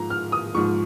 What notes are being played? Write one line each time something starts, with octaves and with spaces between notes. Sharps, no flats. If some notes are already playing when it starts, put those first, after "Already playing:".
Already playing: G#2 F3 A#5
F6
D#6
G#2 F3 C#6